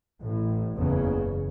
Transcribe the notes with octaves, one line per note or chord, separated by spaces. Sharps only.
A1 A2
F#1 E2 C#3